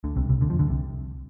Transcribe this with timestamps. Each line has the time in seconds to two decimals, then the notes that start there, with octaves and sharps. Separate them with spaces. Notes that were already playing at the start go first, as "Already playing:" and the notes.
0.04 D2 D3
0.17 C2 C3
0.29 C2 C3
0.41 D2 D3
0.50 F2 F3
0.59 D2 D3
0.69 C2 C3